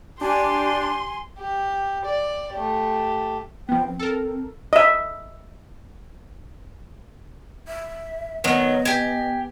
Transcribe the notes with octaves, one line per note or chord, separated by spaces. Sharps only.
D4 G4 G#5 C6
G4
D5
A3 G4
F3 B3 G5
C4
A4 A#4
D#5 E5
E5
D#3 F#3 B3 D#5
G4 G#5